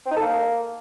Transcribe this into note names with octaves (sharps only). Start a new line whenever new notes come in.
C4
D#4
A4
A#3